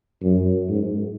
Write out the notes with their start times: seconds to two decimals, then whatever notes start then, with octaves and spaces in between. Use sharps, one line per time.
0.22 F#2
0.69 G#2